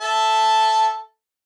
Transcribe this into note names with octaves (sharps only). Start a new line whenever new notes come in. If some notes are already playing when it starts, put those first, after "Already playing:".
A4 E5 A5